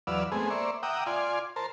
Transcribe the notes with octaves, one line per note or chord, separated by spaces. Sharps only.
E2 F#3 B4 D5 F5 E6
G#3 A3 B3 C4 G#4
A#3 C5 D5 E5 C#6
E5 F#5 G5 A#5 D6 D#6
F4 D5 G#5 C6
A#4 C5 A5